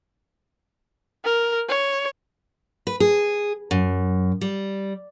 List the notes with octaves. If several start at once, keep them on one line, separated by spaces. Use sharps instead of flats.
A#4
C#5
B4
G#4
F#2
G3